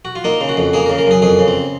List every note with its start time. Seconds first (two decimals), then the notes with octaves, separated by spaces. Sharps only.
0.05 F#4
0.16 F4
0.24 A#3 D#4
0.41 C#3
0.49 F#4
0.57 F2
0.73 A#3 G#4
0.86 A#4
0.89 C#3
0.98 A#4
1.07 F#2 G#4
1.22 F2 G#4
1.39 C#3
1.48 C4